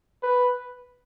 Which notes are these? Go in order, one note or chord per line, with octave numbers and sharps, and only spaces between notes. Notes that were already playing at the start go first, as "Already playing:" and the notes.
B4